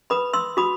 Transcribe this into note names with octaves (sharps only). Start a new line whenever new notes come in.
B4 B5 D#6
C6 E6
F#4 B5 D#6